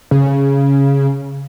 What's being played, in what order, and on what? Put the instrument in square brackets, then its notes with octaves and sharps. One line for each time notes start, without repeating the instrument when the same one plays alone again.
[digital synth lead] C#3